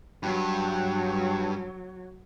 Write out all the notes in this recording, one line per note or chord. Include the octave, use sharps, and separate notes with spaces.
G2 F#3